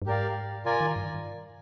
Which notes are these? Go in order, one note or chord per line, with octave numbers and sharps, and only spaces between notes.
G2
G#2 G4 A#4 D5 F5
C3 F4 A#4 D5 G#5
D#3
G2